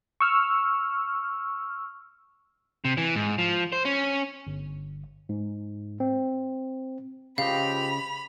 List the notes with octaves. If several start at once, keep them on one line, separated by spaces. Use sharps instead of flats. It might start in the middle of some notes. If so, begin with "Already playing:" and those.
C#6 E6 F6
C3
E3
G#2
F3
C5
C#4
G1
G#2
C4
C#2 C#3 F3 G4 D#5 F5 B5 F7